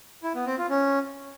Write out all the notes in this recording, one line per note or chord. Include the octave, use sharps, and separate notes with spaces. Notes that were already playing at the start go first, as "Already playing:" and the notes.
E4
B3
C4
F4
C#4